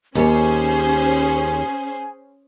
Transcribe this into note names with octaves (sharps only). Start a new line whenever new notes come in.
D#2 C#4 G4 G#4 C5 C#5 G#5